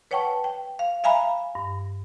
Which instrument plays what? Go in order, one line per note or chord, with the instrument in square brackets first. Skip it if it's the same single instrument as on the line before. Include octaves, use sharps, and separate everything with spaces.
[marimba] B4 C#5 F#5 G5 A5 C#6
G5
F5
E5 F5 G#5 A#5 B5
G2